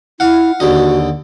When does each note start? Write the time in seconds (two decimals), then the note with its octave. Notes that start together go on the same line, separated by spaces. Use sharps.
0.20 E4 F5 F#5
0.60 D#2 D3 F#4 D#5